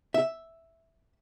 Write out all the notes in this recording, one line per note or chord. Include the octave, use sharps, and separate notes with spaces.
E5